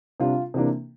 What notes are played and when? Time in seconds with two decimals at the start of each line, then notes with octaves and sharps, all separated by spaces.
0.20 C3 G3 D4 F4
0.54 C3 E3 A#3 D4